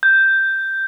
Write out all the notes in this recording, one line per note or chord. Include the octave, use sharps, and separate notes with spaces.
G6